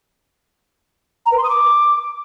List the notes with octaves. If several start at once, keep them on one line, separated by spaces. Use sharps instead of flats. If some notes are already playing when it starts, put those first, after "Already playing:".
A#5
B4
C6
D#6
D6